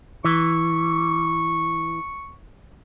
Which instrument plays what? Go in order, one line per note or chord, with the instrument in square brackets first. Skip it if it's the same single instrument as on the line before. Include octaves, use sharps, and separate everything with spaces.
[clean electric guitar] E3 [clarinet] C#6